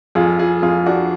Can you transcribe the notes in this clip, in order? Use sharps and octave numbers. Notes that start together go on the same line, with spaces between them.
F2 F4 G#4
F4 G#4
F2 F4 G#4
D4 F#4